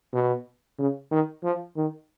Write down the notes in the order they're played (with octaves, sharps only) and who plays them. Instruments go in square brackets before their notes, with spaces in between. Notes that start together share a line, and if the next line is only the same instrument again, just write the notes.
[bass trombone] B2
C#3
D#3
F3
D#3